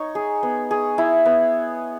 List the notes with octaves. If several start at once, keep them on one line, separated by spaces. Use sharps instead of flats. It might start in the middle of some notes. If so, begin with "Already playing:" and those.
Already playing: D#4 C#5
G#4
B3
G#4
E4
B3